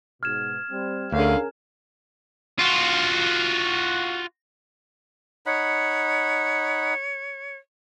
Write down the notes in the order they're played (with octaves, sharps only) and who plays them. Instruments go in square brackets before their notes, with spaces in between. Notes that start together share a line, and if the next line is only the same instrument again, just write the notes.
[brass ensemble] G#2 B2 [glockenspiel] F6 G#6 E7
[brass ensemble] G3 C4
[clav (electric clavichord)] D2 [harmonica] D3 F5 [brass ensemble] C#4 G#4 A#4
[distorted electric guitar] F4 F#4
[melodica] D#4 F#5 B5 [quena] C#5